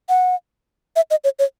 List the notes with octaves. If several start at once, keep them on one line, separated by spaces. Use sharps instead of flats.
F#5
E5
D#5
C#5
C#5